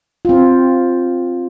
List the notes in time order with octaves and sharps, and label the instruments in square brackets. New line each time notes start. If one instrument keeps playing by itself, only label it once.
[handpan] C4 F4